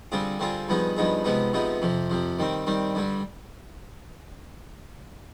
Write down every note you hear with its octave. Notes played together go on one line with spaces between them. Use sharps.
D3 G3 C4 F4 G#4
D3 G3 C4 F4 G#4
G2 F3 B3 D#4 G#4
G2 F3 B3 D#4 G#4
C3 F3 G#3 B3 D#4
C3 F3 G#3 B3 D#4
F2 C3 F3
F2 C3 F3
D#3 G3 C4
D#3 G3 C4
G2 D3 G3